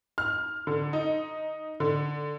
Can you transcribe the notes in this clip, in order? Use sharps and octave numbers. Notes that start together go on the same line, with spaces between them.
F6
D3
D#4
D3